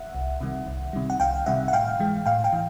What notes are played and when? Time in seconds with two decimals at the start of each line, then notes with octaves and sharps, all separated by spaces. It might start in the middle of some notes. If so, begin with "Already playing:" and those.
Already playing: E5 F#5
0.15 C2
0.41 C3 D#3 G3
0.67 C2
0.93 C3 D#3 G3
1.10 F#5
1.20 C2 F5 G5
1.46 C3 D#3 G3 E5 F#5
1.68 F#5
1.73 A2 F5 G5
2.00 E3 G#3
2.26 A2 F5 G5
2.44 F5 G5
2.53 E3